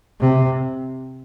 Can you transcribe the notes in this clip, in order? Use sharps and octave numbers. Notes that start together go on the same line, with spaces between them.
C3